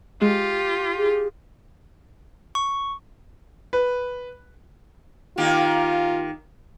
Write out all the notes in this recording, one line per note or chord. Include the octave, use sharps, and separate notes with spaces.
G#3 F4 G4
G#4
C#6
B4
D#3 A#3 F4 G4